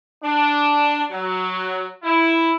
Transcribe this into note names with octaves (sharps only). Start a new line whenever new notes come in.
D4
F#3
E4